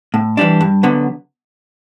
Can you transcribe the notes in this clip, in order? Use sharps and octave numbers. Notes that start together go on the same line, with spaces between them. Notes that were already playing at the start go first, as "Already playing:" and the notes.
A2
E3 G3 D4
G2
D3 F#3 B3